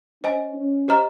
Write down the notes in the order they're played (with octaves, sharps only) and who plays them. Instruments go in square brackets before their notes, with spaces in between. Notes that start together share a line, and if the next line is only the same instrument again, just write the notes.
[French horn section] C#4 [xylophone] C5 D#5 G#5
[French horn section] C#4
[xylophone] G4 C5 D#5 A#5 F6